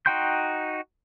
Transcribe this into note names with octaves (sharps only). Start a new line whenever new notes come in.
D#4 F#4 G5 C6 G6